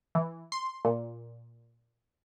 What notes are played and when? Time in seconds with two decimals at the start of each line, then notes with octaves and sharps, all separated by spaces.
0.15 E3
0.52 C6
0.85 A#2